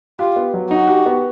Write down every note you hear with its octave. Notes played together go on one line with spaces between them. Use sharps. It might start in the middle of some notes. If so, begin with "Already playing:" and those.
F4 G4
B3
F#3
D#4 F#4
G4
B3